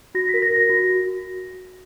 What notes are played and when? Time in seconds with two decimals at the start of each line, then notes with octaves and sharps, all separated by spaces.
0.15 F#4 A#6
0.29 B6
0.34 A#4
0.42 A#6
0.51 F#4
0.56 A#6
0.69 F#4